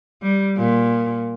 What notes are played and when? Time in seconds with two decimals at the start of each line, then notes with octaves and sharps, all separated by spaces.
0.22 G3
0.56 A#2